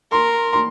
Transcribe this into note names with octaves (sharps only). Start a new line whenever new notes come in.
A#4 C6
C6